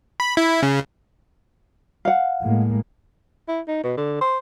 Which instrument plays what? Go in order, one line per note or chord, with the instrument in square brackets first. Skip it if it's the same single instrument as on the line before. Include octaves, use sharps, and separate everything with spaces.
[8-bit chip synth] B5
E4
C#3
[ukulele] F5 F#5
[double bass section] A2 G#3 A#3
[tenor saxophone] E4
D#4
B2
D3
C5